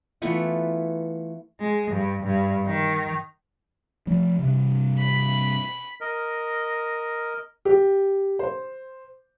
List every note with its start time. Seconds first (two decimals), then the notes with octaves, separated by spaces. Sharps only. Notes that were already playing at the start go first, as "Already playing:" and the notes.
0.22 E3 A3 B3 F4
1.60 G#3
1.90 G2
2.23 G2
2.66 D#3
4.07 F3 A3
4.39 G2 C3
4.99 B5
6.01 A#4 D#5
7.65 G4
8.39 C5